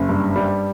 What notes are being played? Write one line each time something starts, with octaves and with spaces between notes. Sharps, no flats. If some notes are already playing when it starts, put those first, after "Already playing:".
Already playing: F#1
G2
G3